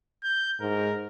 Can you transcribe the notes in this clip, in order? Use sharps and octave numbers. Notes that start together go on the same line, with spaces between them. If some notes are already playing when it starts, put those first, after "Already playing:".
G6
G#2 A#4